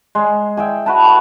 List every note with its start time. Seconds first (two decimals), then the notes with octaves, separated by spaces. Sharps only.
0.15 G#3
0.57 G#4 E5 G5
0.86 F#4 B4 A5
1.04 A4